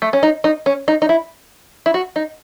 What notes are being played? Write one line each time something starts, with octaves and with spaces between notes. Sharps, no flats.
A3
C#4
D#4
D#4
C#4
D#4
D#4
E4
E4
F#4
D#4